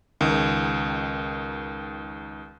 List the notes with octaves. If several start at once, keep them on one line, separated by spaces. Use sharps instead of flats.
C#2 D#3